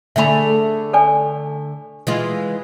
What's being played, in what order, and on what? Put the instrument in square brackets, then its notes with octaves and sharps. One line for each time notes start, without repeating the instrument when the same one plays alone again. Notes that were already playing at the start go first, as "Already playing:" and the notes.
[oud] D3 A3 G#4 [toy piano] E5 B5
[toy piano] A4 D5 G#5
[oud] E3 G#3 F4